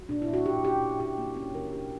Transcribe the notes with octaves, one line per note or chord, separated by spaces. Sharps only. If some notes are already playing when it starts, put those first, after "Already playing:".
Already playing: F#4
A#2 D4
E4
A#2
F#4
A#2 G4
C#4 G4
A#2
A#2 G4
A#3
C#4
E3 A#4
D4 G4